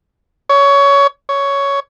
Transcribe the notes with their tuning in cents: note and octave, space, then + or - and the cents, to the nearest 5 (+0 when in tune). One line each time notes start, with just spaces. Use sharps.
C#5 +20
C#5 +10